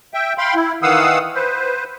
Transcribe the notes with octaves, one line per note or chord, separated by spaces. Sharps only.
E5 G5
F5 G5 B5 C6
E4
D#3 E3 F5 F#5 D#6 E6
B4 C5